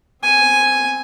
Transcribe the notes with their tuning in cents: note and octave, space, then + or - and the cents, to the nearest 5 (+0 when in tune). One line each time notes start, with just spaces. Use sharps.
C4 -5 G#5 +0